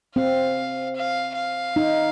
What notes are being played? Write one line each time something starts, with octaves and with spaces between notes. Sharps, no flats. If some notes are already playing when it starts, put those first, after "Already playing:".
C4 F5
F5
F5
D#4